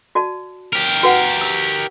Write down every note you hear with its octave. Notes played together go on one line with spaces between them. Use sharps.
F#4 D5 A5
G4 A#4
F#4 B4 F#5
E6